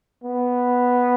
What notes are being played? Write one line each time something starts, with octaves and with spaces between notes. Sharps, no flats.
B3